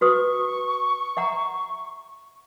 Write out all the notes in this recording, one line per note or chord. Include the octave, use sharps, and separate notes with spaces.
F#4 B4 C#6 D#6
E5 F#5 A#5